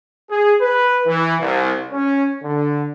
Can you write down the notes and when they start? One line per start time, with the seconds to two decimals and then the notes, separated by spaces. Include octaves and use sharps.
0.31 G#4
0.61 B4
1.07 E3
1.40 C2
1.92 C#4
2.43 D3